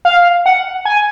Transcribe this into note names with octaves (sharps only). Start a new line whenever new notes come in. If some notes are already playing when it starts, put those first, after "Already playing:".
F5
F#5
G#5